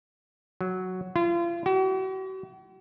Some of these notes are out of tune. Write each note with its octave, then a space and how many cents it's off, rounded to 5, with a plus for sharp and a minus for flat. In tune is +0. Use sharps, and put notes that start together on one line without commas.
F#3 +0
F4 -35
F#4 +45